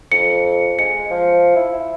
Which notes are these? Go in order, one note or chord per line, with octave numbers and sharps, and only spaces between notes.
F2 C#7
G#3 C#7
F3
E4